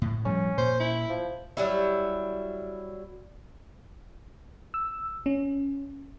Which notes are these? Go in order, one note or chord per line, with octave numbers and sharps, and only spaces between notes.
A2
A2 F3 G3 C#4
A#2 C5
E4
F3
F#3 G3 E4
E6
C#4